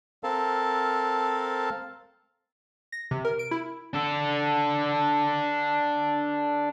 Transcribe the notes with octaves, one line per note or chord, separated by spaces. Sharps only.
C4 A4 A#4 F5 A5
A#6
C3
A#4
D7
E4
D4 A4